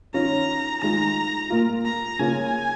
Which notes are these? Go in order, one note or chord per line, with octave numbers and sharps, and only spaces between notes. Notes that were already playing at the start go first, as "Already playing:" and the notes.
D#3 C#4 F4 A#5
D#3 G#3 F4 A#5
A#2 A#3 F4
A#5
C#3 A#3 C#4 F4 G#5